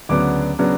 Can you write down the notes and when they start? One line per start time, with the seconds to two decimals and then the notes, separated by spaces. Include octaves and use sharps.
0.09 D2 C#3 F#3 B3 D4 D6
0.59 C#3 F#3 B3 D4